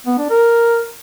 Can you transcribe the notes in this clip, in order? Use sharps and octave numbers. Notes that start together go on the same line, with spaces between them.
B3
D4
A#4